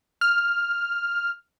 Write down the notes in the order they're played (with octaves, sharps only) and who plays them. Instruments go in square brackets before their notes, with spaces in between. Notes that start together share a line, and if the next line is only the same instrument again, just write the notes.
[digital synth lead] F6